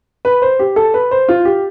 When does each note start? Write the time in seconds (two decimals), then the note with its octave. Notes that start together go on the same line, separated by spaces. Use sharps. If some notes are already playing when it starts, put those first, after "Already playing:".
0.25 B4
0.42 C5
0.59 G4
0.76 A4
0.94 B4
1.11 C5
1.29 F4
1.45 G4